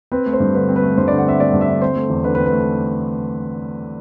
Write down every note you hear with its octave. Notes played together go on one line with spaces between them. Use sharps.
C4 B4
A3
C5
G2
D3 B4
C4
B4
A3
G2 C5
D3 D5
F#5
C4 E5
A3 D5
G2
E5
D3
C4 C5
A3
E2
D3 B4
B4
C4
B4
A3